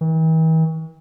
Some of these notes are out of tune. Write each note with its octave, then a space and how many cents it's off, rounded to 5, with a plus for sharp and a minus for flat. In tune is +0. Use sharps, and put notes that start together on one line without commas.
E3 -45